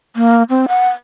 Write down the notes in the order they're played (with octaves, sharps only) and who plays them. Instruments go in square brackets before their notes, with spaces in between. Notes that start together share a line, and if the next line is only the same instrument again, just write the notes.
[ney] A#3
C4
F#5